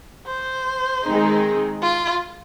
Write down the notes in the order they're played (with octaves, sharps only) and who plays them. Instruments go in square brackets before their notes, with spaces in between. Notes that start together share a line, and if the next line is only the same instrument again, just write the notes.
[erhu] C5
[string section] D#3 G#3 C4 D#4 G#4
[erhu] F4